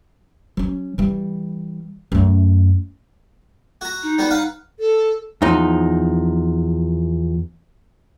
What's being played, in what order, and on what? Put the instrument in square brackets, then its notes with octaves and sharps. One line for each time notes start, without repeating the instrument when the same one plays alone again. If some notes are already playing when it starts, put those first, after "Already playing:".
[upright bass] F#3 C#4
E3 G3
F#2 A3
[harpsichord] F#4 A#5
[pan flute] D#4
[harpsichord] G3 B3 F#4
B4 F5 F#5
[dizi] A4
[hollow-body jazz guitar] E2 F3 D#4